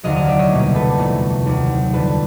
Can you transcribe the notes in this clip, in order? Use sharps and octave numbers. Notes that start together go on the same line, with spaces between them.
F1 D#2 D3 F#3 D#5 F5
D#5 F5
D5 E5
C#5 D#5
C2 B2 G3 A#3
A4 B4
F2 C3 E3 A3
D#2 D#3 F#3
F2 D3 G3 A4 B4